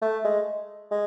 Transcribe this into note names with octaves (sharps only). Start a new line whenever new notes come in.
A3
G#3
G#3